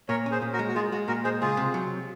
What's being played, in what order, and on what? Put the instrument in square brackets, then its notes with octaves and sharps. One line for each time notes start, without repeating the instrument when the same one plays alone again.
[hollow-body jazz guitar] A#2 [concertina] A#4 C#5
[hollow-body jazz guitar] C#4
[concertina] G#4 C5
[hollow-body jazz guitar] A#2
[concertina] F#4 A#4
[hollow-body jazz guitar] G#3
[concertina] F#4
[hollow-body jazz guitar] G#3 [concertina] F4 G#4
[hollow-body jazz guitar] G#3 [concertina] F#4
[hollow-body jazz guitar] A#2 [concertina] F#4 A#4
[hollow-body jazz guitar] G#3 [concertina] G#4 C5
[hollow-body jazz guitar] C#2 [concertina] F4 G#4
[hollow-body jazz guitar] C3
F#3